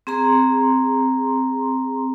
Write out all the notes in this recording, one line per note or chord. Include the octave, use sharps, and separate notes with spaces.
C4 G#4 A#5 C6